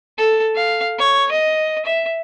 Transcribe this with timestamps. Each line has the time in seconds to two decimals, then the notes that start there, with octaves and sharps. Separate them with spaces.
0.18 A4
0.55 F5
0.98 C#5
1.31 D#5
1.85 E5